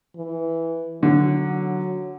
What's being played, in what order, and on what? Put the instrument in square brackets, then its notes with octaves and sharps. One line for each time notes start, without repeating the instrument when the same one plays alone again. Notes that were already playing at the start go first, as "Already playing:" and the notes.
[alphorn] E3
[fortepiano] D3 [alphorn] F#3